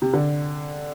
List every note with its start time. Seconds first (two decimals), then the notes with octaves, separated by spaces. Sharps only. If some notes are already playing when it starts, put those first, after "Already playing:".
0.02 C3
0.13 D3